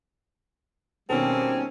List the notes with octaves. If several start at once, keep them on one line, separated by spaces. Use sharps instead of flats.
B2 D#3 G3 A#3 C4 C#4 A4